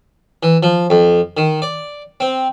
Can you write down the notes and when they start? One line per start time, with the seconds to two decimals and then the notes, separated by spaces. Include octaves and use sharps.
0.43 E3
0.63 F3
0.90 F2
1.37 D#3
1.62 D5
2.20 C4